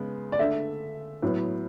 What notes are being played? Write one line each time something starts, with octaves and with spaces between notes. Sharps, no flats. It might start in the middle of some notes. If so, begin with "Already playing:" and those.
Already playing: C#3 G#3 B3
D5
D3 A3 E5
A2 F#3 B3